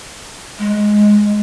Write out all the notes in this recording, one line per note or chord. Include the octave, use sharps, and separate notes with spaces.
G#3